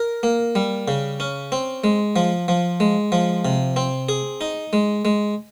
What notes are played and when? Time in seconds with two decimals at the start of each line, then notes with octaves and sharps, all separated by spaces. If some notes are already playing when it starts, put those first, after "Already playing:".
Already playing: A#4
0.23 A#3
0.55 G3
0.88 C#3
1.20 C#4
1.52 C4
1.84 G#3
2.16 F3
2.48 F3
2.80 G#3
3.12 F3
3.45 C3
3.76 C4
4.09 G#4
4.41 D#4
4.73 G#3
5.05 G#3